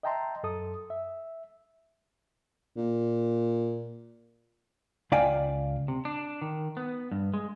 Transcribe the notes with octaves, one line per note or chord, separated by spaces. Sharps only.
D#5 E5 G5 A5 A#5 C6
F#2 A4 D#6
E5
A#2
C#2 D5 F5 G5 G#5
C3
D4
D#3
B3
G2
G#3